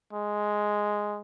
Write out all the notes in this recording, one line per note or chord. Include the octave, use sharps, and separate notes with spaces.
G#3